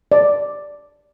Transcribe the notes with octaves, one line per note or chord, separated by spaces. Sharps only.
D5